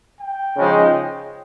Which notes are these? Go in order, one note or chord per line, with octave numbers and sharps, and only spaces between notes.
G5
C#3 F3 G#3 D#4